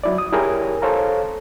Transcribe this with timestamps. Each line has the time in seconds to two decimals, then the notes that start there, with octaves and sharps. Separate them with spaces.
0.04 F#3 E4 D5
0.18 D#6
0.32 E4 G4 G#4 A#4 C#5
0.82 A4 C5 C#5 F5 A#5